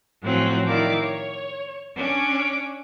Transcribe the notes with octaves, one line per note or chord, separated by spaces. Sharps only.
A2 F3 F#3 C4 C#4
D#3 E4 D5 F5 D6
C#5
C#4 D4 C#5 D6